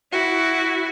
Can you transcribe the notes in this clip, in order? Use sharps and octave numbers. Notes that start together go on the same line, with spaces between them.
E4 F#4